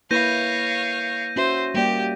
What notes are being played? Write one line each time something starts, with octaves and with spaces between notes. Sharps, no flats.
A#3 E4 B4 C#5 F5 G6 A#6 D#7
C#4 F#4 C5 E5
G3 A#3 G4 D5